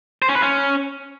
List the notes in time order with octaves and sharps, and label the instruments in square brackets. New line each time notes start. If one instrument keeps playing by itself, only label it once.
[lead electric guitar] C5
C#4
B4
C#4